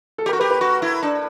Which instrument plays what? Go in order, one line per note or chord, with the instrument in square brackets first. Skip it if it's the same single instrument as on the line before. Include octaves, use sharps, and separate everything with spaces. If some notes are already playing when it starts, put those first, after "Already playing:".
[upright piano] A4
[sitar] G4
[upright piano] A#4
[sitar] F#4
[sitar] G4 [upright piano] B4
[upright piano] B4
[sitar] F#4
E4
D4